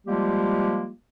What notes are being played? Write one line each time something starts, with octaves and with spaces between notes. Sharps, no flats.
F3 G3 G#3 A#3 F4 G4